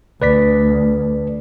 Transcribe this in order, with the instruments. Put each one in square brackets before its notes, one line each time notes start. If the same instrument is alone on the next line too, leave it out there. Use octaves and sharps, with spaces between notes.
[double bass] D2 [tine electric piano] B4 D5 B6